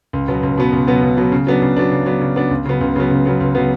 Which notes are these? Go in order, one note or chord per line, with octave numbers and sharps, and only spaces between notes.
C#2
B2 F#3 B3
C#2
B2 F#3 B3
C#2
B2 F#3 B3
C#2
B2 F#3 B3
C#3
F#3 B3 D4
C#3
F#3 B3 D4
C#3
F#3 B3 D4
C#3
F#3 B3 D4
C#2
C#3 F#3 B3
C#2
C#3 F#3 B3
C#2
C#3 F#3 B3
C#2
C#3 F#3 B3